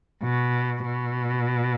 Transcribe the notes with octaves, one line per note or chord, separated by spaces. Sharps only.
B2
B2